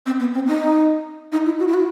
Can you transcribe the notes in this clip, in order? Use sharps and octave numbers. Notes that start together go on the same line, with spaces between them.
C4
B3
C4
D#4
D#4
E4
F#4
E4
F#4